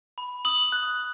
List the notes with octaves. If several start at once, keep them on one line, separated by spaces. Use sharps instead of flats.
B5
D#6 F#7
F#6